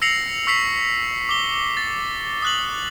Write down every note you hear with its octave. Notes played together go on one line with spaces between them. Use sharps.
E6 A#6 C7 C#7 F7 F#7
C#6 E6 B6 C7 F7
D6 G7
A6
D#6 F#6 F#7